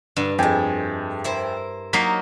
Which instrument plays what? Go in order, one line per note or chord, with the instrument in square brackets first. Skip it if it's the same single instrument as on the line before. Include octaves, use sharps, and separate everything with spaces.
[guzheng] G2 [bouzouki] D3
[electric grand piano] F2 G5 G#5 [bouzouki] G#3 A3
[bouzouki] E4 A#4 C5
[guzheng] F#3 A#3 D#4 [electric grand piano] B6 C7